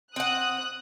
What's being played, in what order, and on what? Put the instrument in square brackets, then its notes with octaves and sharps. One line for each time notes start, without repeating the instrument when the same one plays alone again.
[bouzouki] C4 F#5 [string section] D#6 F#6